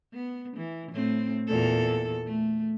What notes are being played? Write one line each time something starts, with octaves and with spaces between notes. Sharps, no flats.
B3
E3
A2 C4
E2 A#2 A4
A3